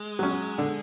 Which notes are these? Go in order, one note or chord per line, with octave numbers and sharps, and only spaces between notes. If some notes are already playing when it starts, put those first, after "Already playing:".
Already playing: G#3
F#3 C#4
D3